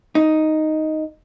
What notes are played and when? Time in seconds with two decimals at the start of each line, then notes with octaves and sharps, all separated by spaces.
0.15 D#4